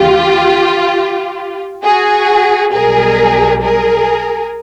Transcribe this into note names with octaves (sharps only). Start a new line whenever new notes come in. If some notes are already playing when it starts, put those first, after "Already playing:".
Already playing: D#2 C#3 E3 G#3 F4 G4
F#4 G#4
B1 B2 G3 G#4 A#4
G#4 A#4